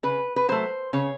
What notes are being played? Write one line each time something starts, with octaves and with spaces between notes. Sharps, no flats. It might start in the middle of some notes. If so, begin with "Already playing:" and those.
C#3 B4
B4
F#3 A3 C5
C#3 C#5